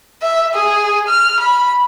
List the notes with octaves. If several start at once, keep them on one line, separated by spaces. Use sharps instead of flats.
E5
G#4
F6
B5